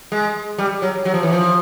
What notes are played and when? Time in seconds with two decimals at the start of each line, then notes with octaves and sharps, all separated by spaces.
0.12 G#3
0.58 G3
0.82 F#3
1.05 F#3
1.14 F3
1.23 E3
1.33 F3